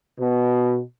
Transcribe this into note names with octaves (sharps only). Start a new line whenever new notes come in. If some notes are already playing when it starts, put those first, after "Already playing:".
B2